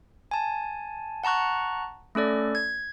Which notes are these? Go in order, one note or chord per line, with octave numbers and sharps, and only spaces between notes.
G#5 A5
F#5 A5 A#5 C#6 F#6
A3 C#4 A4 D5
G#6